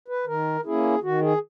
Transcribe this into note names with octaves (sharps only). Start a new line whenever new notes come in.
B4
D#3 A#4
A#3 C#4 E4 G#4
D#3 F#4
G#4